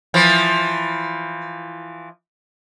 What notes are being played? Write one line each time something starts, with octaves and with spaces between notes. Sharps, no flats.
E3 F3